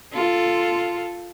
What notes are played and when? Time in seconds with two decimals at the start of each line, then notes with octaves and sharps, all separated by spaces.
0.13 F4 A4